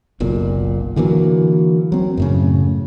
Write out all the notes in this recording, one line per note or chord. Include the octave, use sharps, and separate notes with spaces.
F#1 B1 A#2
D3 E3 F#3 A#3
F#3 C4
F#2 A2 C#3